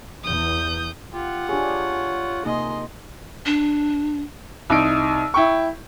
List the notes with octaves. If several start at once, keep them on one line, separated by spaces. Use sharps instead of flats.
E2 D#6 G6
F4 G4 F#5
D4 G4 G#4 C#5
C3 A#3 D#4 G#4 D#5 C6
D4
C2 D#4 E6 D7
E4 G5 C#6